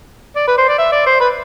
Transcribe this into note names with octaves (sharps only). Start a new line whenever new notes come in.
D5
B4
C5
D5
E5
D5
C5
B4